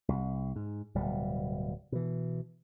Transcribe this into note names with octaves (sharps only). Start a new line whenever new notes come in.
C2
G#2
D1 B2 G3
B2 E3